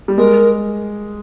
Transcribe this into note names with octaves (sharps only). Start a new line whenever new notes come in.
G3
G#3 A#4